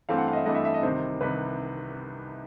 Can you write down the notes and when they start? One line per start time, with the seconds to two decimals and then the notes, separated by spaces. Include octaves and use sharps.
0.09 G2 E3 A3 C4 F5
0.18 F#5
0.28 F5
0.33 D#5
0.36 E5
0.46 G2 E3 A3 C4 D#5
0.55 E5
0.65 E5
0.74 D#5
0.83 C2 C3 D#3 C5
1.21 C2 C3 D#3 B4